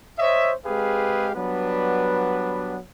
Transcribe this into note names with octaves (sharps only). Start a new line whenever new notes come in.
C5 C#5 D#5 E5
G#3 C4 G4 G#4 B4 F5
F#3 G3 B3 D4 B4